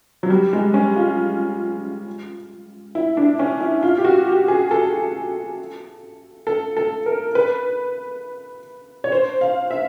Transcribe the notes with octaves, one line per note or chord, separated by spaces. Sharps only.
F#3
G3
G#3
C#4
F4
E4
D4
C#4
E4
F4
G4
F#4
G4
G#4
A4
A4
A4
A#4
B4
C#5
C5
F5
E5